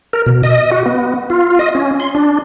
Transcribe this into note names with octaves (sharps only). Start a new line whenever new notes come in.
A#4
B2
D#5
F#4
B3
F4
D#5
C#4
C6
D4